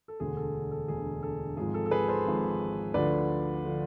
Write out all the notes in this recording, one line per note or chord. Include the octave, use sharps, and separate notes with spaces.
A4
E1 D2 D3 G#4
A4
A4
E1 D2 D3 G#4
A4
G#1 G#2 F3 G#4
A4
A4
G#4 B4
A4 C5
G#1 G#2 F3
D2 D3 F3 B4 D5
D3 F3